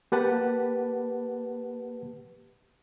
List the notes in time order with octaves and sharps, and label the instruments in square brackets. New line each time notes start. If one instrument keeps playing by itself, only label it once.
[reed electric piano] A#3 G4 B4 F#5 A5